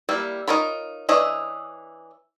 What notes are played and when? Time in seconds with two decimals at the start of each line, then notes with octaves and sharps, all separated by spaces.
0.09 G3 A#3 E4
0.48 D#4 F4 A#4 C#5 B5
1.09 E3 D4 C#5 D#5 E5